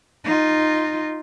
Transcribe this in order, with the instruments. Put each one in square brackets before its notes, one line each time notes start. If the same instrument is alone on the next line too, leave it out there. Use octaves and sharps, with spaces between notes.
[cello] D#4 F4